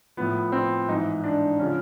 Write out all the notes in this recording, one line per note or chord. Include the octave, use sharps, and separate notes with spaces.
A2 F3 B3
C4
G#2 E3 D#4
D4
C#3 F3 C#4